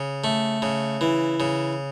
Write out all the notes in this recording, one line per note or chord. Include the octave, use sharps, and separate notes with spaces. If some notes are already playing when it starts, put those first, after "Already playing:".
Already playing: C#3
A3
C#3
E3
C#3